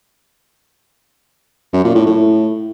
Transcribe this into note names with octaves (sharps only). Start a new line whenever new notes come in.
F#2
A#2
A2
A2